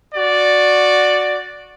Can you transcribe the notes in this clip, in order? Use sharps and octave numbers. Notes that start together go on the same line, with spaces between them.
F#4 D5